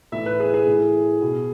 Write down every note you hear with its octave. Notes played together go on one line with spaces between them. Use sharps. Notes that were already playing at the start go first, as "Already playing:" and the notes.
A2 E3 E5
B4
G#4
G#4
A2 E3
B2